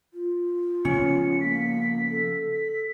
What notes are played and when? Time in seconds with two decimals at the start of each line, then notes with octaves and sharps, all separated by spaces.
0.14 F4
0.85 C#3 F3 B3 C#4 C#7
1.41 A#3 B6
2.10 A4
2.52 B6